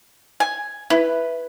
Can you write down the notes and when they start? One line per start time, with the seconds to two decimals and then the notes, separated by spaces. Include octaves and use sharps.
0.40 G#5
0.90 E4 B4